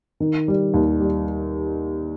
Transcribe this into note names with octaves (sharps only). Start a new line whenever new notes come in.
D#3
G3
D#2
G3